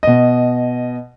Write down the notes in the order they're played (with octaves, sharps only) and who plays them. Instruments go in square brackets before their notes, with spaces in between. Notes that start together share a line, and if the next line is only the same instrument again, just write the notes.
[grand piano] B2 D#5